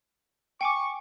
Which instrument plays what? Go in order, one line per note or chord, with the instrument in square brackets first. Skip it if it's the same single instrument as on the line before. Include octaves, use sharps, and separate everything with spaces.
[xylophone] G5 G#5 D6 [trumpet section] C#6